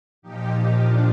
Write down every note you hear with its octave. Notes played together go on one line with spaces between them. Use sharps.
A#2 F3 D#4 G4
D4 F4